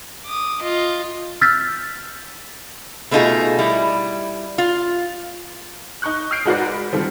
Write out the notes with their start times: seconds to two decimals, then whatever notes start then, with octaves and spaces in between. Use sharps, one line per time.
0.25 D6 D#6
0.62 F4 D#5
1.41 E6 F6 G6 A6 B6
3.11 B2 A3 B3 D#4 F4 G#4
3.59 G3 E4
4.58 F4
6.02 D#4 C#6 F#6
6.31 D#6 F6 G6 C7 D7
6.45 G#3 D#4 F#4 A#4 B4 D5
6.72 B5
6.93 D#3 G3 C4 F4 A4